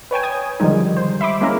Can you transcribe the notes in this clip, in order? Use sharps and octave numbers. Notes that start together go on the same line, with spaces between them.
B4 C#5 G5 G#5
D#6 G#6
D3 D#3 F3 G3 G#3 D#4
C5
E5 B5 C6 D6
G#3 A#3 C#4 E4 A#4